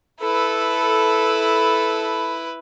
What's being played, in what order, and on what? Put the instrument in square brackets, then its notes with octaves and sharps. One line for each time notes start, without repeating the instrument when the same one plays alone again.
[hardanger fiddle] E4 B4 [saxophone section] A4